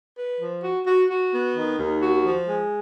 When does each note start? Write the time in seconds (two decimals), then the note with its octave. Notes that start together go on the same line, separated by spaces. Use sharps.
0.18 B4
0.41 F3
0.64 F#4
0.87 F#4
1.10 F#4
1.33 B3
1.56 D#3
1.79 D#2
2.02 F#4
2.25 F3
2.48 G#3